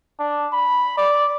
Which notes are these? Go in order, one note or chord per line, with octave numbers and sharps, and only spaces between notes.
D4
B5
D5